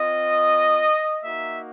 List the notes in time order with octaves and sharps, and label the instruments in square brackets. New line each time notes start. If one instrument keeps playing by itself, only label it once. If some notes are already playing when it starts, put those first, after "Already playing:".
Already playing: [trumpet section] C4 F4 D#5
A#3 D#4 F#4 E5